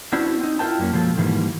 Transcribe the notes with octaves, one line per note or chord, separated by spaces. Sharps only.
B3 C#4 D4 E4 F#4 C5
C4 D#4
E4 F4 A#4 B4 G5 A5
F#2 A#3 C#4
B2 F3 G#3 A#3 A4
G#2 D#3 E3 F#3 G3 A#3